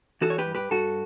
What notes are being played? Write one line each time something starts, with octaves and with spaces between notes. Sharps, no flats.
E3 F#4 A4
C#5
G4 B4
G2
G4 B4
G2 F#4 A4